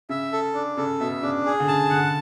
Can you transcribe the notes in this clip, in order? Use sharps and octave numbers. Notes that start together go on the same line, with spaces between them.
C#3 E5
A4
D4
C#3 A4
B2 E5
C#3 D4
G#4
D3
C#3 A5
D3 F#5